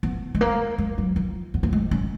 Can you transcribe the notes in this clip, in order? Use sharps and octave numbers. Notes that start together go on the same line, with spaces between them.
B3
G#3
A#3
G#3
F#3
F3
B3
A#3
G#3
C#4